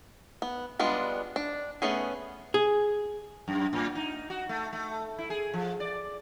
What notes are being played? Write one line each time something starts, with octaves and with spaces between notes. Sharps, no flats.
B3
G3 G#3 B3 D4 F4
D4
A3 B3 C#4 G#4
G#4
F#2
A2
D#4
F#4
A3
A3
E4
G#4
F3
D5